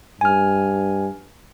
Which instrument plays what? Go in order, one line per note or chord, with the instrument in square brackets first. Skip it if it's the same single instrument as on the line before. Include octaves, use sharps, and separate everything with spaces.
[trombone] G2 [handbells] G#5 F6